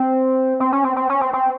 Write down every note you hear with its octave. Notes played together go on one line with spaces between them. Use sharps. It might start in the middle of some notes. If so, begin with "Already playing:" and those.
Already playing: C4
C4
C#4
C4
C4
C#4
C4
C4